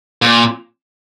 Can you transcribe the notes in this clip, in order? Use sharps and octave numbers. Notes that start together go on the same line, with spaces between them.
A#2